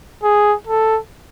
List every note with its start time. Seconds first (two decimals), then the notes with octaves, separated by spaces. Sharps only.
0.23 G#4
0.67 A4